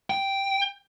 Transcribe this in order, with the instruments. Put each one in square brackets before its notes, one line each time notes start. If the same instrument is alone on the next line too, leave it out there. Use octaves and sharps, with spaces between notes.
[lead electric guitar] G5